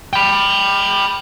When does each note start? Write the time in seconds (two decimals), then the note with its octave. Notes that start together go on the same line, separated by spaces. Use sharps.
0.13 G5 B5